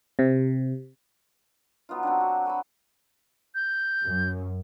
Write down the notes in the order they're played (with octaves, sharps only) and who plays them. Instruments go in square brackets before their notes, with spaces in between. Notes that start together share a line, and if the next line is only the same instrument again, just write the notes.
[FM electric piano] C3
[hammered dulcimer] F#3 B3 D#4 F4
F#3 C4 D4
F#4
F#4 B4 A5 B5
[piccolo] G6
[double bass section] F#2